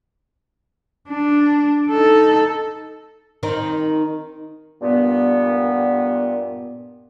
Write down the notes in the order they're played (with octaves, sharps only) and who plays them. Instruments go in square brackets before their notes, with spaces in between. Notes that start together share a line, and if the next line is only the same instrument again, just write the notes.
[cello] D4
D#4 A4
[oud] D#3 C4 D#4
[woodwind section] G2 A#2 B3